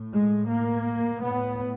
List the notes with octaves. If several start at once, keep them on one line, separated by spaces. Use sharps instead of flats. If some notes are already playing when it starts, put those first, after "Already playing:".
Already playing: A2
G#3
A#3
A2 B3